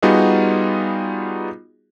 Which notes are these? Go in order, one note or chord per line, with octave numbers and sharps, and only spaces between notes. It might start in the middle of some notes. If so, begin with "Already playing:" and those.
G3 B3 D#4 F4 F#4 G#4